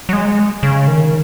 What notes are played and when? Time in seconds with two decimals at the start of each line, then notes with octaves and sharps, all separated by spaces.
0.09 F#3
0.13 G#3
0.63 C#3
0.88 D#3